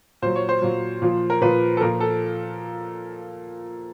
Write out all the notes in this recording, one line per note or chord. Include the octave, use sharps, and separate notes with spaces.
A#2 F#3 C5
C#5
C5
A#2 F#3
A#2 F3
A#4
A#2 F3 B4
A4
A#2 F3 A#4
A4